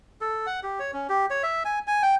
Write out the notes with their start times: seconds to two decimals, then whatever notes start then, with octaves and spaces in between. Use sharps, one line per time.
0.21 A4
0.46 F#5
0.63 G4
0.79 C#5
0.93 C#4
1.09 G4
1.30 C#5
1.43 E5
1.65 G#5
1.87 G#5
2.03 G5